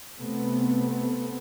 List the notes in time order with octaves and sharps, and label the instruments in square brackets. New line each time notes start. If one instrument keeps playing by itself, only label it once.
[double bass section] C3 A3 B3 C4